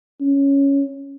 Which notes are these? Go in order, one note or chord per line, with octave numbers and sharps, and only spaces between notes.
C#4